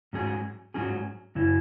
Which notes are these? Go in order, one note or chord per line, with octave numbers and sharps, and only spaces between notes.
G#2 F#3 C#4 G#4
G#2 F#3 C#4 G#4
F#2 C#3 E4